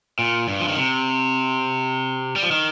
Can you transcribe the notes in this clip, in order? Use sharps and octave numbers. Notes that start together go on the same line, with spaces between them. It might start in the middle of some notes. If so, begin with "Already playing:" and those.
A#2
G2
F3
D#3
C3
G3
F3
D#3